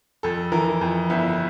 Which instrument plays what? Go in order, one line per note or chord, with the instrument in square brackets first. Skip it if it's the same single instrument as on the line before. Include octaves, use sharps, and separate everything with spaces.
[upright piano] F2 A4
E3 A#4
F2
G1 E4